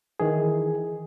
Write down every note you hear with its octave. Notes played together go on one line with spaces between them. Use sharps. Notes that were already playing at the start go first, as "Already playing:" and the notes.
D#3 E3 G#4